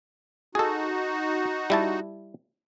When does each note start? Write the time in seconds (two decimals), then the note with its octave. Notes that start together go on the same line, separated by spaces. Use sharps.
0.55 D#4 F#4 G#4 A4
1.70 G3 E4 A5